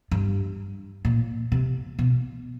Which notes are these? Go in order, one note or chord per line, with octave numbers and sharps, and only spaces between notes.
G2
A#2
C3
B2